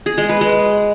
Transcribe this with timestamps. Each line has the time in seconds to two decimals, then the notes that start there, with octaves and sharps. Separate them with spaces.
0.06 G#4
0.18 G#3
0.29 B4
0.41 G#3